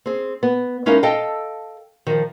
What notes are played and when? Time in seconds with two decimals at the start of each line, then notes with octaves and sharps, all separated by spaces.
0.06 C4 G#4
0.43 B3
0.86 G#3 C#4 D#4 E4 A#4 F5
1.03 A4 D#5 F5 G5 A5
2.07 D#3 F3